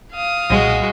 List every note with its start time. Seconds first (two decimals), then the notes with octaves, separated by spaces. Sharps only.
0.13 F5 D#6
0.50 B1 A#2 G3 G#3 F#4